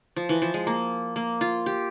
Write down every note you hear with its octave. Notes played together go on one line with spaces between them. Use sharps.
F3
E3
F3
G#3
A#3
A#3
F4
G4